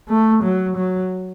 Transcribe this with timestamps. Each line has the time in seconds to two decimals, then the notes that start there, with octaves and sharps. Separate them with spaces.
0.09 A3
0.43 F#3
0.76 F#3